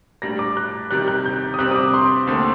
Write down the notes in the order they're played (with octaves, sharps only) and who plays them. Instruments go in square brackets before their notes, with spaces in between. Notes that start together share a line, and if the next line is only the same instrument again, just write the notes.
[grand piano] A2 G3 D4 [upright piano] A#6
[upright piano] D6
F#6
[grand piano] C3 D#3 G3 [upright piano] F#6
[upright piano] F#6
G6
D#6
[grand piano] C3 G3 C4 [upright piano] F#6
[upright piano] D#6
D6
C6
[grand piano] D#2 D3 A3 C4